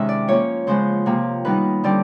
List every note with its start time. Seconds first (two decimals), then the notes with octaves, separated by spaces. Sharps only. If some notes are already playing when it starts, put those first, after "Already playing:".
Already playing: C3 D#3 G#3 C#4 E5
0.09 D5
0.28 F3 A#3 C#4 C#5
0.67 C#3 F3 G#3 B3 C5
1.06 C3 F3 A#3
1.45 D#3 G3 B3 D#4 B4
1.84 D3 G3 C4 D5